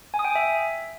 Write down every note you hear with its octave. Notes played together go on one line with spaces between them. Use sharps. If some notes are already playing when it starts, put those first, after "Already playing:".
G#5
D#6
G5
G#5
E5